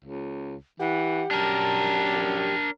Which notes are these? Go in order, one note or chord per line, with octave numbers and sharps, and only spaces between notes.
C#2
E3 G4 F#5
F#2 D4 A#4 A5